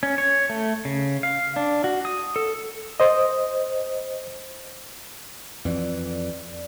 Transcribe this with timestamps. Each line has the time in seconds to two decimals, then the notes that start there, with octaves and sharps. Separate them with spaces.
0.03 C#4
0.18 C#5
0.50 A3
0.85 C#3
1.23 F5
1.56 D4
1.84 F#4
2.05 D#6
2.36 A4
3.00 C5 D#5
5.65 F2 E3 D5